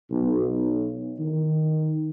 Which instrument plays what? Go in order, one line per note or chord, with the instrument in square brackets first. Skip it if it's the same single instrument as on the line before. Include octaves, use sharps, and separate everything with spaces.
[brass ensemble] B1
D#3